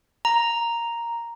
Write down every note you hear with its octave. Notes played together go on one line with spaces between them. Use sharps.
A#5